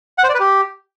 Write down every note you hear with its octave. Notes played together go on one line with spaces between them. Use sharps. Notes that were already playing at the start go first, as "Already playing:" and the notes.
F#5
C5
D5
B4
G4